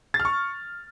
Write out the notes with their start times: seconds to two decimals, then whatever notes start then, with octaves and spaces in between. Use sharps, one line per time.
0.14 A6
0.20 F6
0.25 C#6